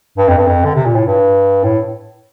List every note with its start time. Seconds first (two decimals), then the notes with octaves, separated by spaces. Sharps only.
0.18 G2
0.28 F2
0.38 G2
0.47 F2
0.65 D3
0.75 C3
0.86 A#2
0.95 A2
1.06 G2
1.64 A2